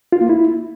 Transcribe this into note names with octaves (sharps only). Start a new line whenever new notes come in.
F4
A#3
E4